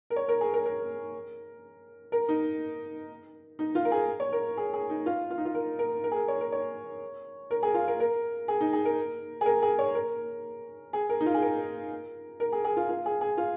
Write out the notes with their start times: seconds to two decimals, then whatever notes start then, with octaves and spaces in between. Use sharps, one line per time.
0.10 A#4
0.16 C#5
0.28 A#4
0.41 G#4
0.53 A#4
0.66 A#4
2.12 A#4
2.29 D#4
3.59 D#4
3.75 F4
3.85 A#4
3.92 G#4
4.20 C#5
4.32 A#4
4.57 G#4
4.73 G#4
4.90 D#4
5.06 F4
5.30 F4
5.38 D#4
5.45 F4
5.55 A#4
5.79 A#4
6.04 A#4
6.11 G#4
6.16 A#4
6.28 C#5
6.41 A#4
6.52 C#5
7.51 A#4
7.63 G#4
7.74 F4
7.88 A#4
8.00 A#4
8.48 G#4
8.61 D#4
8.73 G#4
8.85 A#4
9.41 G#4
9.46 A#4
9.62 G#4
9.79 C#5
9.95 A#4
10.93 G#4
11.09 A#4
11.21 D#4
11.26 F4
11.34 G#4
11.42 A#4
12.40 A#4
12.52 G#4
12.64 G#4
12.77 F4
12.89 F4
13.06 G#4
13.21 G#4
13.38 F4